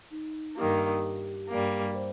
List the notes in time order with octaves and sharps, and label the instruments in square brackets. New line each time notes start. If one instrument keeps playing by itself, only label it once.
[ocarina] D#4
[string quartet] G2 D#3 A#3 [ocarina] G4
[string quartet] G2 G3 A#3
[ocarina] C5